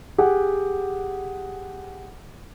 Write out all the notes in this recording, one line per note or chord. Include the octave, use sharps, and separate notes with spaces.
G4 G#4 F#5